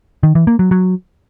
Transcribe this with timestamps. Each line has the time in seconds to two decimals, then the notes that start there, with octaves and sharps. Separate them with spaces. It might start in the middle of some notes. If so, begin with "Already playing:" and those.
0.23 D#3
0.35 E3
0.47 A#3
0.59 F#3
0.71 F#3